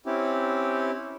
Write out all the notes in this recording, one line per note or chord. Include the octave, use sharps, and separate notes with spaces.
C4 C#4 E4 G4